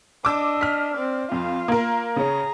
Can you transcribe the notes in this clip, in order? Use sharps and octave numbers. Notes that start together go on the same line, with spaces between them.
D4 D#5 D6 E6
F6 B6
C4 D5
F2 F4 F5
A#3 A#4
C#3 C#4 G#4 A#5